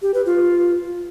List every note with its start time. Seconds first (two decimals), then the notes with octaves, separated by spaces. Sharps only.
0.02 G4
0.14 B4
0.26 F4